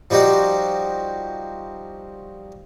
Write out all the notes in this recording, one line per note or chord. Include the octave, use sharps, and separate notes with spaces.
F3 G3 D#4 F#4 G4